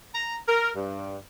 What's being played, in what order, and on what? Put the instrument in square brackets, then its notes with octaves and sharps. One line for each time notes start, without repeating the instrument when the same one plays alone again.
[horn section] A#5
A#4
G2